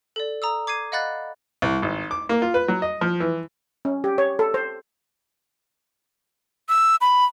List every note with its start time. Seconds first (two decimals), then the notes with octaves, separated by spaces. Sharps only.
0.16 A4 D5
0.42 A#5 D#6 E6
0.67 D6 G#6 C7 D#7
0.92 D#5 F5 F#5 B5 F#6 A6
1.62 C2
1.82 G#1
2.11 D6
2.29 A#3
2.42 F4
2.54 B4
2.68 F#3
2.82 D#5
3.01 F3
3.20 E3
3.85 C#4
4.04 G4
4.18 C#5
4.39 A4
4.54 C5
6.69 E6
7.01 B5